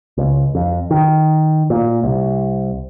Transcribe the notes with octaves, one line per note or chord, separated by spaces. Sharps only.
C#2
F2
D#3
A#2
C2